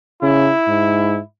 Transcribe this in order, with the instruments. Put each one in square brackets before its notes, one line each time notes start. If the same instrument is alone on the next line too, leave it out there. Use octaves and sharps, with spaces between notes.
[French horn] C#3 [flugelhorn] E4
[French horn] G#2